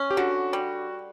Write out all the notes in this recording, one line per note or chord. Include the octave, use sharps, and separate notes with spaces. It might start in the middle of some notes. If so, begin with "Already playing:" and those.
Already playing: C#4
G4
D3 F#4
G3